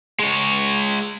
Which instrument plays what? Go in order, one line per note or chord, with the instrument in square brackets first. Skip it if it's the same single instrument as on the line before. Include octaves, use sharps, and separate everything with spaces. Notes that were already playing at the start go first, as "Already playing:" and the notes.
[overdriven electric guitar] G#3 C#5